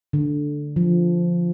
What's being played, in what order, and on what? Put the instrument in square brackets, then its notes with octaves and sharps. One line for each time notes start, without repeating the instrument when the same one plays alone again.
[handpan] D3
F3